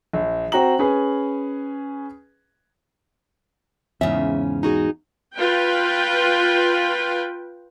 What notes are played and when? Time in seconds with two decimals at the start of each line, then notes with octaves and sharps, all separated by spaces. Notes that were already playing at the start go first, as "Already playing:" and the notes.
0.13 A#1
0.52 C4 F#4 G5 A#5 F#7
0.79 C#4 G#4 B4
4.01 E2 G#2 C#3 C#4 E5
4.63 D#4 F#4 G#4
5.34 F4 B4 G5